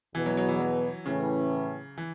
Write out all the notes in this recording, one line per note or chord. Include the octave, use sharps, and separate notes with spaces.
E2 B2 E3 B3
F#3
F#3
E3
F#3
A2 C#3 E3 C#4
E3